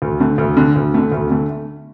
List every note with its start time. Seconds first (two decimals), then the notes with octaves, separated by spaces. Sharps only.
0.02 D2
0.20 D3 A3
0.38 D2
0.57 D3 A3
0.76 D2
0.94 D3 A3
1.12 D2
1.30 D3 A3